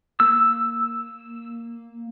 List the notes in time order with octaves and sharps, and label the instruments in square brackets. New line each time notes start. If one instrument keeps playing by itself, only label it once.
[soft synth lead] A#3 [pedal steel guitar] E6